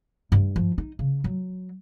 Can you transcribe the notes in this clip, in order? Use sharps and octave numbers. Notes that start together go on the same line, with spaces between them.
G2
F3
D#4
C#3
F#3